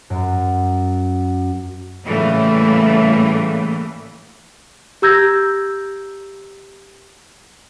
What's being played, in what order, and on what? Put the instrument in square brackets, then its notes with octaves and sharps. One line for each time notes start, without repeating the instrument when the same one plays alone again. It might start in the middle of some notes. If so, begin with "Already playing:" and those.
[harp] F#2
[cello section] A2 C#3 E3 G3 A3 A#3
[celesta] G4 A#5 E6 G6 G#6 A#6